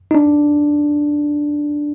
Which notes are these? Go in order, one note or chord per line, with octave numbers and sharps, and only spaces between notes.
D#4
D4